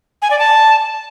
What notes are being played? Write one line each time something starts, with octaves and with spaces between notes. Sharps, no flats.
G#5
D5
A5